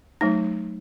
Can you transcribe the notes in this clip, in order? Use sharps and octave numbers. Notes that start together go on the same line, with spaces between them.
F#3 A3 D#4